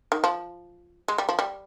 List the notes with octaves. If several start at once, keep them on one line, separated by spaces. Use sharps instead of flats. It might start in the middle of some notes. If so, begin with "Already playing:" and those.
D#3
F3
G#3
G3
F3
G3